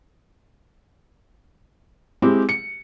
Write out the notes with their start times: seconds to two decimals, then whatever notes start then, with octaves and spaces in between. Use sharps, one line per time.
2.22 G#3 C4 E4 G4
2.49 C#7